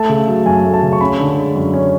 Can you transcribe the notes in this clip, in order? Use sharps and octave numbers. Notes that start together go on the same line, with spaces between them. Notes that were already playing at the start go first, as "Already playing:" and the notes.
Already playing: A3 A5
C#3
F#3
F#2 G#5
A3
A5
C#3
C#6
C#4 B5
D3
G#3
F#2
C#4